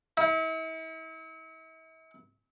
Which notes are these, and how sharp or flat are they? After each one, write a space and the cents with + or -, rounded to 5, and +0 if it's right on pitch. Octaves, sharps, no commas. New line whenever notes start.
E4 -40